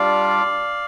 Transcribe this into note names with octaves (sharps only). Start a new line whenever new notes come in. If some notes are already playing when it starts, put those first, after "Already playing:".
Already playing: G3 D4 F4 D5 F5